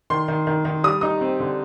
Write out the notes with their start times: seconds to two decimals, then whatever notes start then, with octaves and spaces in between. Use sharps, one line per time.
0.10 D#3 C6
0.28 D#3
0.47 D#3
0.65 D#3
0.84 G3 D#6
1.01 D#4 D#6
1.21 C4
1.40 D3